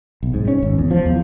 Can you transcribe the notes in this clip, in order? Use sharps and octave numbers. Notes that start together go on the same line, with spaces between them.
B1
G#2
C#4
G#1
E2
F3
E2